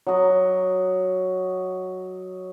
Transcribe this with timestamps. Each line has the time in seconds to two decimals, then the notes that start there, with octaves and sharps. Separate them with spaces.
0.07 F#3 D#5